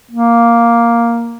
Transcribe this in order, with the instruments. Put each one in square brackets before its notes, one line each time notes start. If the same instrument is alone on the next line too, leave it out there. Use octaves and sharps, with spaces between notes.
[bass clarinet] A#3